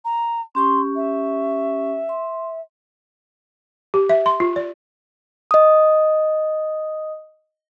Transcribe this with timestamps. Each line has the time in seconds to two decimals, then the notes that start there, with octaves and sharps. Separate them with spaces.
0.05 A#5
0.55 C#4 G4 C6 C#6
0.95 E5
2.09 C6
3.94 G4
4.09 E5
4.26 C6
4.40 F4
4.56 D5
5.51 D#5 D#6